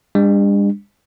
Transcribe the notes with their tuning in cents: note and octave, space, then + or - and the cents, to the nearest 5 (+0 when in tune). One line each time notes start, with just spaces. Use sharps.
G3 +45 D4 +0